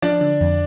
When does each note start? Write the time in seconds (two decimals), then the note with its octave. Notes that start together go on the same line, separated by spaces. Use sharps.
0.02 F3 D4 D5
0.21 D3
0.41 F2